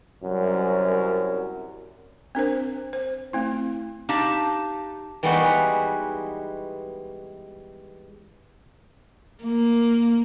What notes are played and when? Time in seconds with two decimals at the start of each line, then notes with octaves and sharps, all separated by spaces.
0.23 C2 F#2
2.35 C4 D4 A#4 C5
2.93 C5
3.33 A3 C4 E4
4.09 D4 D#4 G4 F5 A5
5.23 E3 G3 G#3 B3 D#4 F#4
9.43 A#3